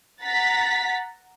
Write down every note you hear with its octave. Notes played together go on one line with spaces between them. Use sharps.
F#5 A#5 A6 B6